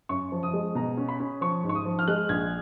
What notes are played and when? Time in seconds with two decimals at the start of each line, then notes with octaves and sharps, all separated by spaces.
0.09 F#2 C#6
0.32 F3
0.43 D#6
0.53 G#3
0.75 B2 A#5
0.97 C#4
1.09 B5
1.20 C#4
1.41 F3 C#6
1.64 G#2
1.69 C#6
1.75 D#6
1.85 F3
1.99 F6
2.08 G#3 F#6
2.29 A#1 G#6